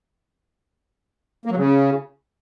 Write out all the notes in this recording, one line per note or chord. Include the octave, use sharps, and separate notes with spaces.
A#3
F#3
C#3